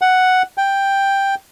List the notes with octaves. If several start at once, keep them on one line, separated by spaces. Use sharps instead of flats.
F#5
G5